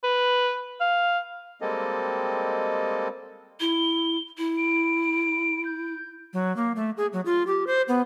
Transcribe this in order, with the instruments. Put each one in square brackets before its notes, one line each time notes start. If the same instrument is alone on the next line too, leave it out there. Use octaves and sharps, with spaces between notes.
[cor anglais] B4
F5
[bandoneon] G3 G#3 A#3 C4 A4 D#5
[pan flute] E4 [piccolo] G7
[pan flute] E4
[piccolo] D7
G6
[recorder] F#3
A#3
A3
G#4
F#3
F4
G4
C5
B3